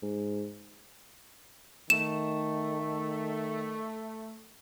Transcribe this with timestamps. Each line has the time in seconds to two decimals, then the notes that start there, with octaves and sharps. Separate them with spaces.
0.02 G#2
1.90 D#3 A3 E7